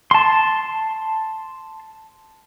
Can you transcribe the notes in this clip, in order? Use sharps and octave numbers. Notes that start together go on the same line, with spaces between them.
A5 C6